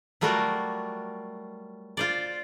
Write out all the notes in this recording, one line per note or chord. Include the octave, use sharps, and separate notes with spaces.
F#3 G3 A3 F4 F#4 A#4
F4 C5 D5